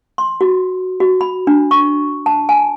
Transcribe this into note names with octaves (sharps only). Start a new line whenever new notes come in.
C6
F#4
F#4
B5
D4
C#6
A5
G#5